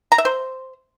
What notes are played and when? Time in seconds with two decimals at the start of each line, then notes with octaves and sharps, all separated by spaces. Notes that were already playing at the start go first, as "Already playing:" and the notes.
0.12 A#5
0.18 E5
0.25 C5